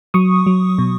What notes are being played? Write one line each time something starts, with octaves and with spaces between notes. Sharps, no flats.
F#3 C#6 D#6
F#3
B2